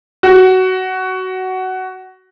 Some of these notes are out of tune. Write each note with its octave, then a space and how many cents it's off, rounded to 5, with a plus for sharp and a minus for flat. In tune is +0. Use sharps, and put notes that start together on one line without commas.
F#4 +15